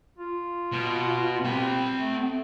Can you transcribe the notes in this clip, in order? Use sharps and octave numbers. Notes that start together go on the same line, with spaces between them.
F4
B2
C4 G4 B5
A3